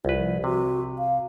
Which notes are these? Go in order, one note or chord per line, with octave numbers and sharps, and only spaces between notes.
C2 F4 B4
F3
C3 F#4
F5